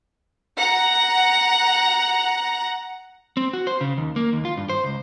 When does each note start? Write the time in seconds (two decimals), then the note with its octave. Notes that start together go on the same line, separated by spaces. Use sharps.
0.56 F#5 A#5
3.37 C4
3.53 F#4
3.67 C5
3.81 C#3
3.98 D#2
4.16 A#3
4.33 D#2
4.45 F4
4.57 G2
4.69 C5
4.83 C#2